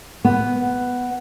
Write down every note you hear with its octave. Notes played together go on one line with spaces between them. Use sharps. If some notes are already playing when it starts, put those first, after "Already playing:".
B3